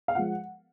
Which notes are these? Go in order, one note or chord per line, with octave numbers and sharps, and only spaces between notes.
F5
F3 G#3 F#5